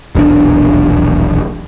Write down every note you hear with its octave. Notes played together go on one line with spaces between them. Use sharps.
D#1 B1 E2 D4